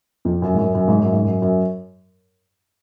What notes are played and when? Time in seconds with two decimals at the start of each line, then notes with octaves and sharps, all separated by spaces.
0.25 F2
0.42 F#2
0.54 G#2
0.58 F#2
0.75 F#2
0.88 G#2
0.99 F#2
1.13 G#2
1.25 F#2
1.42 F#2